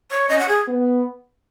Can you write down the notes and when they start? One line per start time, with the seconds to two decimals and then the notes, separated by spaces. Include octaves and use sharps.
0.11 C#5
0.29 C#4 D#5
0.39 F#5
0.48 G#4
0.68 B3